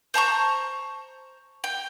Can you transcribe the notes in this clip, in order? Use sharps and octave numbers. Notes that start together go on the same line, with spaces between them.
C5 A5 A#5 C#6
G5